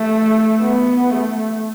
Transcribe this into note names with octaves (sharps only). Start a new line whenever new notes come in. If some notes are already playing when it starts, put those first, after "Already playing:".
Already playing: A3
B3
A3